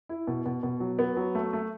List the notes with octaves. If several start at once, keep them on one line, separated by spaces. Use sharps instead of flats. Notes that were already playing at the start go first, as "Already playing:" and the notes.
E4
B2
B2
B2
F#3
B3
F#3
A3
A3